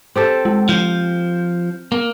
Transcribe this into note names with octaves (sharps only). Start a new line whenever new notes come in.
C4 G4 A4
G#3
F3 F6 G6
A#3